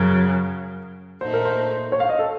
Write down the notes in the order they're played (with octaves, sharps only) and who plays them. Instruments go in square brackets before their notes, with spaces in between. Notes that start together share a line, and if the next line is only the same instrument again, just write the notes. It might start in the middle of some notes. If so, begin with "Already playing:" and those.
Already playing: [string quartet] F#2 C#3 F#3 [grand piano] A#4
[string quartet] A#2 A3 D#4 [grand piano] C5
[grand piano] A#4
C5
C#5
F5
D#5
A4